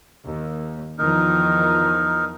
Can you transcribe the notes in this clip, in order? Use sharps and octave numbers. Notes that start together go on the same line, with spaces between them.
D#2
E2 D#3 F3 D#4 A#4